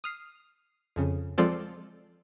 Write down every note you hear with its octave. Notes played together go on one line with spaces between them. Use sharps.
D#6 F6 C7
F2 C#3
F3 G#3 C4 F4 A4 D5